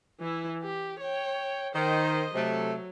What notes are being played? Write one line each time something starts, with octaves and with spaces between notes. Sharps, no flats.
E3 E4
G4
C#5 G5
D#3 C5 D#5
C3 F#3 A3